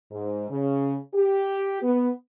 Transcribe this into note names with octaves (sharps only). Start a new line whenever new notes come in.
G#2
C#3
G4
B3